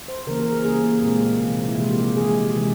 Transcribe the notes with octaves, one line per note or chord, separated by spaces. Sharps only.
C5
C#3 E3 A#3 A#4
A#4
G#4
C#3 G3 A#3 G#4
A#3
A#2 G#3 C4
C3 E3 A#3
E4
C3 F3 G#3 F4
G4
E3 G#3 G#4
C3 E3 G#3